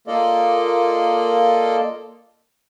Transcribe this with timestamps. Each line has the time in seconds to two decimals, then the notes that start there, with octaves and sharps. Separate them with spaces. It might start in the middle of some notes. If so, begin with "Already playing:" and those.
0.07 A#3 F4 A4 D5 D#5